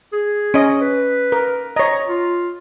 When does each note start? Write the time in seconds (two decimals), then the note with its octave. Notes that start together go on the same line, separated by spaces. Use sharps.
0.12 G#4
0.54 C#4 D#5
0.81 B4
1.32 A#4
1.76 C#5 D#5 A#5
2.08 F4